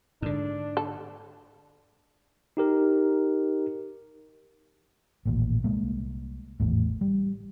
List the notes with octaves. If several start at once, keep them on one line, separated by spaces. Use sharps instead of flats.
G#2 D3 D4
A4
D#4 G4 A#4
A1 D#2 A#2
C2 G#3 A#3
G#1 E2 A2
G3